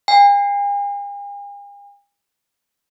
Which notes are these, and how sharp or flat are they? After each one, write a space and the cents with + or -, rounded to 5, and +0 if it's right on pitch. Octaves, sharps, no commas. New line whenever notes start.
G#5 -45